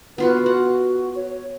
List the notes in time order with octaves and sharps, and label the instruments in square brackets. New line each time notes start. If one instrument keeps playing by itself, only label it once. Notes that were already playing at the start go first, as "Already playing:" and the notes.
[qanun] B3 F4 F#4 [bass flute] B4
[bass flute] F#4 [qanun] F#5
[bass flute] C#5